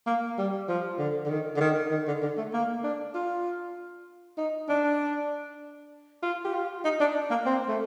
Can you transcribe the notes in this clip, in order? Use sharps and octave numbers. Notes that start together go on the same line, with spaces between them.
A#3
G3
F3
D3
D3
D#3
D3
D#3
D#3
D3
D3
A3
A#3
D4
F4
D#4
D4
F4
G4
F4
D#4
D4
A#3
C4
A3